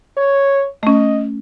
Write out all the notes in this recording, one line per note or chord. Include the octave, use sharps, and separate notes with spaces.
C#5
A3 C#4 D#5